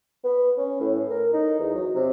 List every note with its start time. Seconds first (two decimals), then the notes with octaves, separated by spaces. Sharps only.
0.24 B3
0.57 C#4
0.80 A2
1.10 A#4
1.33 D#4
1.59 E2
1.75 F#3
1.95 C3